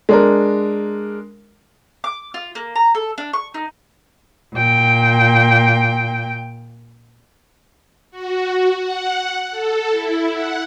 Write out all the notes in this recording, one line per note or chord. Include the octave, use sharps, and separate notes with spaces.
G#3 D4 A#4
D6
F4
A#3
A#5
A4
D4
C#6
D#4
A#2 G5
F#4
F#5
A4
E4
F#5